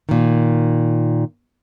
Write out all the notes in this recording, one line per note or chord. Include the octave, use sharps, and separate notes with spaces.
A#2 D#3